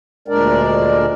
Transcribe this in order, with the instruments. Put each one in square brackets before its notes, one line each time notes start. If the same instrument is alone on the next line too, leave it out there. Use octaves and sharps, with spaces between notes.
[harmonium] D2 A#2 G#3 D4 A#4 D5